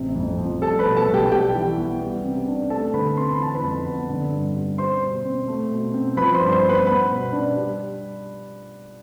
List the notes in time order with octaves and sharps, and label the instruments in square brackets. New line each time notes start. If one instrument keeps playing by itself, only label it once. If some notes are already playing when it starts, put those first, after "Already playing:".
Already playing: [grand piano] A1 C3
F2
F3
G3 A4 A5
B4 B5
B2
A4 A5
B1
G4 G5
G3 G4 G5
E3
B3
G3
C3
D4
A3 A4 A5
D3 B4 B5
C4 C6
B5
E3 A5
B4 B5
F2
B3
D3
G2
G3
G3 C5 C6
B2
C4
A3
B2
C4
F3 B4 B5
C5 C6
G2
C5 C6
B3
B4 B5
B3 B4 B5
B2
D4
G3